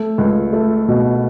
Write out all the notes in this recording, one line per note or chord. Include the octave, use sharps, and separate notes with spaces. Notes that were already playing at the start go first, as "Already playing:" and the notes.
Already playing: A3
C#2
A3
B2